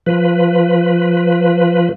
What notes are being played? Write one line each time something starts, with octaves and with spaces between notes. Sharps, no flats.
F3 B4